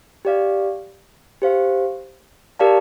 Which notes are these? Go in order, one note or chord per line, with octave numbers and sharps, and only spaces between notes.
G4 D5 F5
G4 C5 F5
G4 A#4 D5 F5 A5